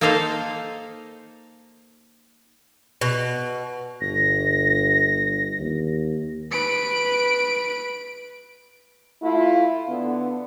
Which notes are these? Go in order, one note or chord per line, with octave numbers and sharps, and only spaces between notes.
A#3 D#4 A4 C5 D#5 F5
B2
G1 A#6
D#2
B4 D7
A3 E4 F4
D3 B3